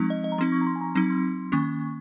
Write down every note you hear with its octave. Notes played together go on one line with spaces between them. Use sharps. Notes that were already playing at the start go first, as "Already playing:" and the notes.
Already playing: F3 G#3 C4 D#4
D#5
D#5
A#5
F3 C4 D#4 C6
C#6
A#5
C6
G#5
A#5
F#3 C4 D#4 A#5
C6
D#3 A#3 C#4 C#6